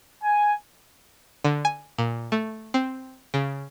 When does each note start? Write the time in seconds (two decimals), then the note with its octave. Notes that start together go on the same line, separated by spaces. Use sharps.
0.23 G#5
1.44 D3
1.65 G#5
1.98 A#2
2.32 A3
2.74 C4
3.34 C#3